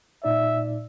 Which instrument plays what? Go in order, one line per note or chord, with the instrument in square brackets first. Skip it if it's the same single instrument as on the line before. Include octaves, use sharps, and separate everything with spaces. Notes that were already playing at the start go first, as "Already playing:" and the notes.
[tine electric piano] A#2 D#4 D5 [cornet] E5